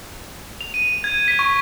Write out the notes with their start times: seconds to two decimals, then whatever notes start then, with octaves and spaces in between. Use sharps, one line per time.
0.61 F7
0.74 D#7
1.04 G#6
1.28 B6
1.39 C#6